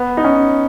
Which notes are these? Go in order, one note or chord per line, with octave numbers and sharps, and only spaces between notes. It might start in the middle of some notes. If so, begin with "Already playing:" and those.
Already playing: B3
D#4
C#4